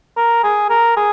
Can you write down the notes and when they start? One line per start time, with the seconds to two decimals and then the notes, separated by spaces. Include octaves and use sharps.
0.17 A#4
0.43 G#4
0.70 A#4
0.97 G#4